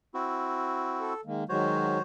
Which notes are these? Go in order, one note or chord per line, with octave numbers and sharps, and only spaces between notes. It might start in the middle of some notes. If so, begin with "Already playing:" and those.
C4 E4 F#4
A4
D#3 G#3 A#3
D#3 F#3 G#3 F#4 C5 C#5